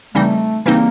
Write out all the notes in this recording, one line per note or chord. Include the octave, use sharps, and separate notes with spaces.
C#3 E3 G3 A3 C4 D#4
C#3 E3 G3 A#3 C4 D#4